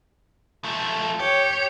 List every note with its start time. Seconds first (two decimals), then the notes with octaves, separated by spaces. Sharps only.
0.64 F3 A3
1.19 G4 C#5